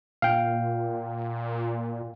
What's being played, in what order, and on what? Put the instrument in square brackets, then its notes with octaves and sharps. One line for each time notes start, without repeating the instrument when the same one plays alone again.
[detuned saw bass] A#2 [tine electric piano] F5 G5